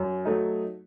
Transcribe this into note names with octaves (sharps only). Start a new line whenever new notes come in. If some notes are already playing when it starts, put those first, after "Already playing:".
Already playing: F#2
F#3 A3 D#4